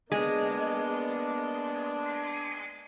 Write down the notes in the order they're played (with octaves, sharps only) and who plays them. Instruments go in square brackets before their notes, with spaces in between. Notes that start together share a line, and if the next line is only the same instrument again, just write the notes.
[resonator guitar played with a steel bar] G#3 [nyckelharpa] A#3 B3 [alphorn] D4